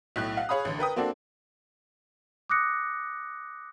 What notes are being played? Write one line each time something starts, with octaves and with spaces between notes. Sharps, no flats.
B1 A2 F#6
F5 F#5
G#4 C#5 F5 B5 D#6
A1 D3
A#4 B4 G5 D#6
A#3 C4 D4 F#4 A4
D6 D#6 F#6 A#6 C#7